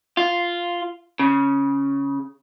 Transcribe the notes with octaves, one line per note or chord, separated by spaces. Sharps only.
F4
C#3